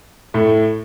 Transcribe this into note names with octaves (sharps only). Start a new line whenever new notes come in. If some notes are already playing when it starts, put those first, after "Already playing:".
A2 A3